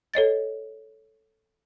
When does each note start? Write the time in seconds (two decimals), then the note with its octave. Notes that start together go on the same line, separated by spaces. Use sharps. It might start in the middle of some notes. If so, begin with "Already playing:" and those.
0.14 A4 C#5 D#5 A6